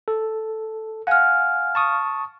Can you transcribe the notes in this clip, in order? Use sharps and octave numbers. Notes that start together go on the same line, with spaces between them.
A4
F5 F#5 G#5 F6
A5 C#6 D#6